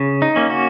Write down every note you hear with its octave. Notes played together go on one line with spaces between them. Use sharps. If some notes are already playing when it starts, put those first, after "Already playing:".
Already playing: C#3
D#4
A#3 C#4
F#4